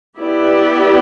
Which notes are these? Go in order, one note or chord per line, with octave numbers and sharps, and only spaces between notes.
B3 E4 G4 D5